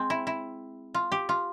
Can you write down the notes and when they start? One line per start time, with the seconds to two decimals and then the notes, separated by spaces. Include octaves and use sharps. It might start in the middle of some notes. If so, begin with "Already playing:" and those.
Already playing: G#3 C4
0.10 E4
0.27 E4
0.94 F4
1.12 G4
1.29 F4